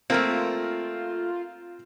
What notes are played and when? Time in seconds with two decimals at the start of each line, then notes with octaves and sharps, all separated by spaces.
0.10 A3 A#3 C4 F4 A#4